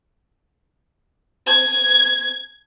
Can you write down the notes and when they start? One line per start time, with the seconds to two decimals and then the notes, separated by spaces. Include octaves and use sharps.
1.47 G#6